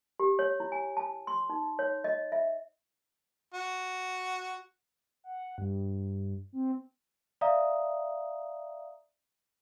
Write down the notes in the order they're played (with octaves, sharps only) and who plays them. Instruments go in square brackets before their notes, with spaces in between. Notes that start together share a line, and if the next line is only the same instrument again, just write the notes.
[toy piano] G4
C#5
E4
G#5
A5
C6
D#4
C#5
D#5
E5
[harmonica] F#4
[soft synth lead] F#5
G2
C4
[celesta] D5 E5 F5 A#5 D#6